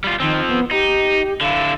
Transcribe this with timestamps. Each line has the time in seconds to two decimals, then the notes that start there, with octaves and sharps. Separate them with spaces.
0.04 G3 F4
0.20 D#3 F3 C4
0.48 B3
0.71 D#4 G4
1.41 D3 E4 F5